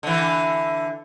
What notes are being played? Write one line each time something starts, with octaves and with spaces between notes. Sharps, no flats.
D3 E3